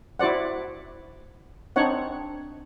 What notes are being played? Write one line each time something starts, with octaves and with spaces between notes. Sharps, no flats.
E4 F#4 C5 D5 F#5
C4 D4 D#4 C#5 F#5